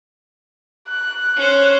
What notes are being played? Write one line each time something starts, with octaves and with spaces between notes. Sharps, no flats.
F#6
C#4 C5